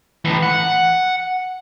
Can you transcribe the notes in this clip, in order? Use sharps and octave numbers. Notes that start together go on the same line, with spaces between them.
A2 E3
F#5